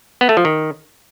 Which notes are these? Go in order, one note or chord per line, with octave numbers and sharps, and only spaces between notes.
B3
A3
F3
D#3